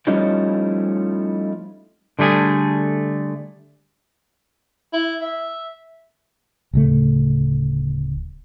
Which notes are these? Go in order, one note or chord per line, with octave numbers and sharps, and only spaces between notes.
F3 G3 A3 C#4 D#4 E4
D3 G3 A3 G#4
E4
E5
D1 C#3 A3